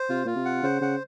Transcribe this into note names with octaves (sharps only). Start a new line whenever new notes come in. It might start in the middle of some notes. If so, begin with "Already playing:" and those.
Already playing: C5
C3 F4
A#2 F4
C3
F#5
C#3 C5
C#3 F#5